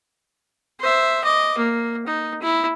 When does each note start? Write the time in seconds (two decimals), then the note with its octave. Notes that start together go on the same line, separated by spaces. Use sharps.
0.80 C5 E5
1.24 D#5 D6
1.58 A#3
2.07 D#4
2.42 E4